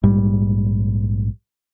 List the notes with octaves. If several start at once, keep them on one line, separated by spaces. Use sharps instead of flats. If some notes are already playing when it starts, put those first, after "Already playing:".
A#1 G#2 G3